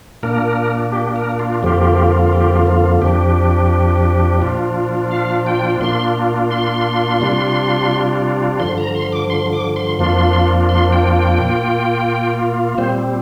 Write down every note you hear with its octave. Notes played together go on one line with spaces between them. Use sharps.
A#2 A#3 D4 A#4
G4
A#4
F4
F2 D3 F3 A#3 F4 G4
G4
F4
F2 F3 D4 G4
A#2 F3 D4 F4
F5
G5
A#2 A#3 D4 F4 C6
C6
C3 G3 D4 F4
G2 D3 F3 C6
A#5
C6
D6
C6
D6
C6
F2 F3 A#3 D4 F4 C6
C6
G5
G5
A#2 A#3 F4
A#2 G3 C4 C5